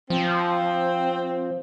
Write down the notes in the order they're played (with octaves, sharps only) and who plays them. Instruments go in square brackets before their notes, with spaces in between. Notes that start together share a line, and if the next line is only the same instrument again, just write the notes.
[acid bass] F3 [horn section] C4